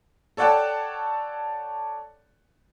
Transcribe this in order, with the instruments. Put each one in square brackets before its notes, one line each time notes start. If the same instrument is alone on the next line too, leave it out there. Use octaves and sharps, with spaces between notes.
[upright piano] A4 C#5 D5 F#5 G5 A5